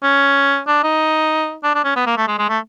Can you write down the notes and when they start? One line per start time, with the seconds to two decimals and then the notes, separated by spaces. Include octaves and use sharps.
0.03 C#4
0.67 D4
0.83 D#4
1.64 D4
1.75 D4
1.84 C#4
1.96 B3
2.06 A#3
2.17 A3
2.28 G#3
2.39 G#3
2.49 A3